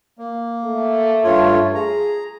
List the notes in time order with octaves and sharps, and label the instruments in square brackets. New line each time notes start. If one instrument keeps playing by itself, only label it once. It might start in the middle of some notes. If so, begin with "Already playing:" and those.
[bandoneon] A#3
[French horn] A3
[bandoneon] G2 F4 C#5
[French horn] G#4 [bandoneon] A#5